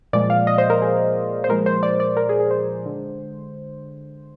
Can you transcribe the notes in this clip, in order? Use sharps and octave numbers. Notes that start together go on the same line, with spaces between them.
A#2 F3 G#3 D5
F5
D#5
C5
A#4
G#4
C5
A#2 F3 G#3 A#4
C5
D5
D5
A#4
G#4
G#4
C5
D3 G#3